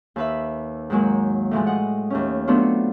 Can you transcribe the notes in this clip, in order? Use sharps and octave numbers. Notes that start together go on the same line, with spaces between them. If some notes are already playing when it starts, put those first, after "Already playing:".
D#2 B4 E5
G#2 D#3 F#3 G#3 A#3
A2 E3 F3 G#3
D#5 F#5
D#2 A3 C#4
F#3 A3 B3 C4 D4 F4